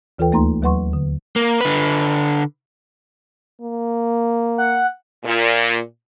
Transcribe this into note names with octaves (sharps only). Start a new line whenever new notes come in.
D#2 E3 F4 A4 B4 G5
D2 A3 A#3 D#4 A#5 C6
D#2 F#3 B4 F#5 C6 C#6
D3
A#3
D3 B4
A#3
F#5
A#2